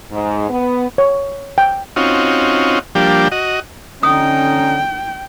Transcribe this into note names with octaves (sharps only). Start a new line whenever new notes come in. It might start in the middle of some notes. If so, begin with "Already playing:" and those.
G#2
B3
C#5
G5
C4 C#4 D#4 F4 F#4
F3 G3 A#3 D4 G4
F#4 D#5
D3 C#4 D#4 G5 D#6